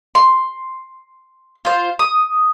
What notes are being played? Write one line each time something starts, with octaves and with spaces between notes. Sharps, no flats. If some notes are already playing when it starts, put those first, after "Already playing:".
C6
F4 C5
D#6